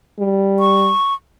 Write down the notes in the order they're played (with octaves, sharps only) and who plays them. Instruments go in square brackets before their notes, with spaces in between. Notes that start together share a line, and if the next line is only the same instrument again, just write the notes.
[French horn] G3
[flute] C#6